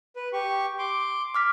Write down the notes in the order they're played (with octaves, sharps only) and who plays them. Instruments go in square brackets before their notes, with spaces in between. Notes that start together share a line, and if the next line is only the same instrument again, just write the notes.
[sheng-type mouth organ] B4
G4 C#6
C6 D6
[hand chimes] D6 F6 B6